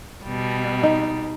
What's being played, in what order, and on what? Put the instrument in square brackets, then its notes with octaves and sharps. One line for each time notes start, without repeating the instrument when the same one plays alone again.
[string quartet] B2 G3
[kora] D#4